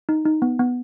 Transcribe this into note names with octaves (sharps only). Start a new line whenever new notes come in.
D#4
D#4
B3
B3